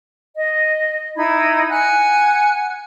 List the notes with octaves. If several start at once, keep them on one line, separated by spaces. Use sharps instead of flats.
D#5
D#4 E4 B5 G#6
F#5 G#5 F#6